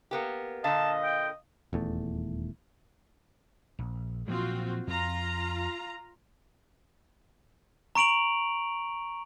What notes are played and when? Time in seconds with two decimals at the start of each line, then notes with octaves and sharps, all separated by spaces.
0.11 A#3 B3 G4
0.64 A#2 D3 D#5 F5 A5
1.03 G5
1.73 D#1 E2 A3
3.79 A#1
4.28 A#2 F3 F#3 C4 F4 F#4
4.87 F2 F4 A#5
7.95 A#5 C#6 D7 F7 F#7